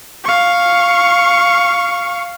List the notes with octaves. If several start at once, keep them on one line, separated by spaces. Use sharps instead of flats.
F5 C#6